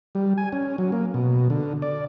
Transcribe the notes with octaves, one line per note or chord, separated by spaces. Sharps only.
G3
G#5
C#4
F#3
A#3
B2
D3
D5